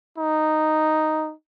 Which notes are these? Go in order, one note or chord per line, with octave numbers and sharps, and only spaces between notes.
D#4